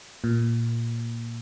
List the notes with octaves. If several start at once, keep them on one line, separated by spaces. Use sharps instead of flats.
A#2